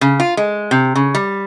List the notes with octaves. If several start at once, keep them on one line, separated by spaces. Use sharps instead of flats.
C#3
F4
G#3
C3
C#3
G3